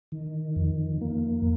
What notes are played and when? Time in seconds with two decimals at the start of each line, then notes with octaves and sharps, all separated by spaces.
0.12 D#3
0.56 F2
1.01 A#3